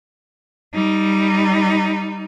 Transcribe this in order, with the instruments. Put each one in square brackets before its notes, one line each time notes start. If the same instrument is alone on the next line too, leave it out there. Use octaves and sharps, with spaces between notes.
[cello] G3 D#4